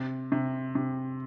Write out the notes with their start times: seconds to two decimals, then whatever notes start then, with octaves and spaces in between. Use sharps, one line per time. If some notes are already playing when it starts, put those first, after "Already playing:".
Already playing: C3
0.32 C3
0.75 C3